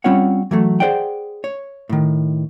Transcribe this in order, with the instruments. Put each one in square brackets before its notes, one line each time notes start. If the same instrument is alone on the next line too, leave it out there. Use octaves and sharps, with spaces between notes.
[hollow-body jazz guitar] G3 C4 C#4 F4 C#5 F#5
E3 F#3 A3
G#4 B4 C5 D5 F#5 G5
C#5
A2 D#3